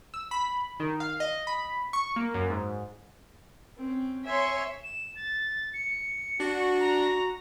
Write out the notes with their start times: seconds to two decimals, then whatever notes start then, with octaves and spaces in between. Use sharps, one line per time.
0.14 E6
0.31 B5
0.80 D#3
1.00 F5
1.20 D#5
1.47 B5
1.93 C#6
2.16 A#3
2.34 F#2
2.50 G#2
3.77 C4 C#4
4.26 C#5 E5 G#5 C6
4.84 E7
5.16 A6
5.74 C#7
6.40 D4 F#4
6.80 A#5